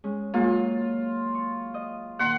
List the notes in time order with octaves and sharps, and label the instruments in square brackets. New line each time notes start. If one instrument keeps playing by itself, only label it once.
[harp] G#3 C#4
[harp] F#3 G#3 A#3 [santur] F4
[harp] C#6
D#5
[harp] A#2 D#3 [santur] F#5 C6